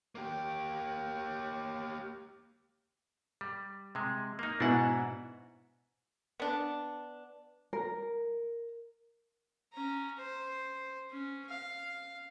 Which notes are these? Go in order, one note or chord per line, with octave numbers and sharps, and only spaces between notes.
A#3 G4
G3
C3 G#3
A#3 D#4
G#2 B2 D4 E4 F#5
B3 D4
A#4
C#4 A#5
C5
C#4
F5